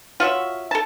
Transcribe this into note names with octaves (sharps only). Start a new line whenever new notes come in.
F4 F#4 C#5 E5
A4 A5